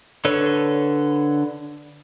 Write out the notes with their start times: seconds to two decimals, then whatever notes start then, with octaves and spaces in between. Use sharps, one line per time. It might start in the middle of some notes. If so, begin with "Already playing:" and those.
0.25 D3 A4 B4 C#5